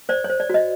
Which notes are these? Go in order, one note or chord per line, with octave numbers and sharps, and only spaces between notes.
C5 D5
C#5
C5
D5
F#4 D#5